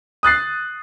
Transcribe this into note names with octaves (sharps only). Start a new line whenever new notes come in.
D#6 F#6 A6 C7